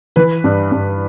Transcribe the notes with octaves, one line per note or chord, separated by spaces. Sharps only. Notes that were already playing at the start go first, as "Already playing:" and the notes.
E3 B4
G2
G2